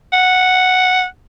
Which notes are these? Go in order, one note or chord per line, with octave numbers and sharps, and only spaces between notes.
F#5